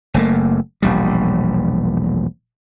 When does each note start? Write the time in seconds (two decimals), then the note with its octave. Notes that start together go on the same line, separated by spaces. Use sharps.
0.14 F#1 A3 A#3
0.82 E1 A#1 G3